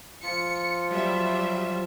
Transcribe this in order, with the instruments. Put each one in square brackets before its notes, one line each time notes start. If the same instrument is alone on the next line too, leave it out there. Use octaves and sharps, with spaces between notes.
[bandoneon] F3 F4 [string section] C#7
[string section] F#3 G3 E5